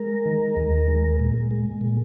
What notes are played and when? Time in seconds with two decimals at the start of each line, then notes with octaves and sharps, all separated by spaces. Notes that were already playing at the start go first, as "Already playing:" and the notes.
Already playing: G#3 A#4
0.26 D#3
0.56 D#2
0.88 G#3
1.19 A#2
1.51 G#3
1.81 A#2